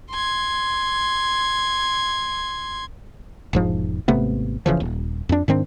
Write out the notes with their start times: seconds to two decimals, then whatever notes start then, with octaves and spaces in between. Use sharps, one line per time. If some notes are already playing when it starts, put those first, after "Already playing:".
0.11 C6 G#6
3.53 E1 G#2 F3
4.08 G#1 C3 A3 B3
4.66 F#1 C#3 E3 F3
4.80 D#1
5.29 F2 D4
5.48 G#2 D#3 C4 D4